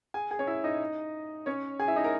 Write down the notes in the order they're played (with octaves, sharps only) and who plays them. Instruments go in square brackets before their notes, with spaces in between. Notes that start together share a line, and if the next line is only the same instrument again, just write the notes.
[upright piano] G#4 G#5
G#4 G#5
C#4 C#5
E4 E5
D#4 D#5
C#4 C#5
G#4 G#5
E4 E5
D#4 D#5
A#4 A#5